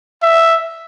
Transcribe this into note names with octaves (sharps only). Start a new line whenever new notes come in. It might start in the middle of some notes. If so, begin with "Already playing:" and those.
E5